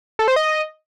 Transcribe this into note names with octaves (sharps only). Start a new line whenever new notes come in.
A4
C5
D#5